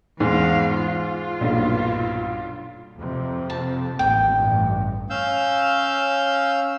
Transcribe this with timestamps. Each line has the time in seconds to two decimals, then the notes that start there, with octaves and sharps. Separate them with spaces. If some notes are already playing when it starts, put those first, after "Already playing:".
0.20 E2 G#2 F5
0.76 F4
1.41 B1 G2 A#2
2.98 F2 C3
3.50 A5
3.99 A1 D#2 G#2 G5
4.33 A1 G2
5.10 C#4 F5 E6 G6